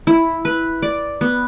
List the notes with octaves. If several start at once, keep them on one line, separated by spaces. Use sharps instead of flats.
E4
B4
D5
B3